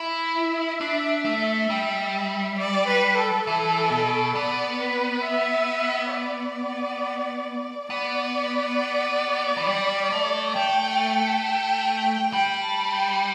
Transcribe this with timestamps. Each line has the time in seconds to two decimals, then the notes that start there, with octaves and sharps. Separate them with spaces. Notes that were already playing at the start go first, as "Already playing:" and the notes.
Already playing: E4 E5
0.81 D4
1.25 A3
1.70 G3
2.58 D5
2.88 B4
3.17 A4
3.47 E3 A4
3.90 B2
4.35 B3 D5
4.80 B4
5.24 E5
6.13 D5
7.90 B3 D5
9.57 E3
9.67 G3
10.12 A3
10.56 A3 G5
11.45 G5
12.33 G3 G5
12.63 A5
12.93 G5